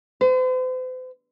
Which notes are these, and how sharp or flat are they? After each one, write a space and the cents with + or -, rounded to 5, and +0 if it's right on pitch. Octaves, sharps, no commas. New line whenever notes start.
C5 -45